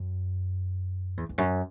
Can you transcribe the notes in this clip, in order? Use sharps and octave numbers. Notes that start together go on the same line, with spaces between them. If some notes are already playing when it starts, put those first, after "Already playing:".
Already playing: F#2
E2
E2
F#2